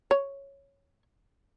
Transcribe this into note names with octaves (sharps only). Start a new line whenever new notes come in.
C#5